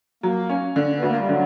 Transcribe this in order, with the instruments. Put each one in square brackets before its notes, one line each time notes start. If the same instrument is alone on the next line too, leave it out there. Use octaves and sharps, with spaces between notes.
[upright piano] F#3 [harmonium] A#3
[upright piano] C#4
D3
[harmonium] B3
[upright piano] D2 [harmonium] A#3
[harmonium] G3
[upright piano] D3 [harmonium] F#3